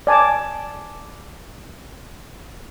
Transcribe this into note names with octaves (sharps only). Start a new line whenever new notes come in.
D5 G#5 A5 D6